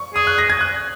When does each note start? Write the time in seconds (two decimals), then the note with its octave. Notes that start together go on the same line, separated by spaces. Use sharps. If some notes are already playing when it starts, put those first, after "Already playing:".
Already playing: C#6
0.15 G#4 D#6
0.27 F#6
0.38 A#6
0.50 G#6
0.61 F#6